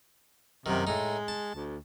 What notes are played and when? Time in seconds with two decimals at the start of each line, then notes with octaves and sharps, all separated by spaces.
0.66 F#2 C3 D#3
0.87 A2 G#3 D#4
1.28 A5
1.55 D2